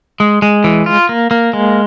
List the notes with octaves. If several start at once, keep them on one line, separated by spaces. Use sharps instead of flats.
G#3
G#3
E3
F4
A#3
A#3
G#3